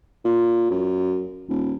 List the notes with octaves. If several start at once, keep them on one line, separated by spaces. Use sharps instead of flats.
A#2
F#2
D#1